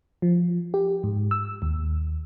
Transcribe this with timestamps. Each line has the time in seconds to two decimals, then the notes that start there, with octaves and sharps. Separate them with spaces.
0.22 F3
0.74 G4
1.03 G#2
1.31 E6
1.62 D#2